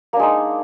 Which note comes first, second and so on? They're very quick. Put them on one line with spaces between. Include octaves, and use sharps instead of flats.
A#3 D4 G#3 D#4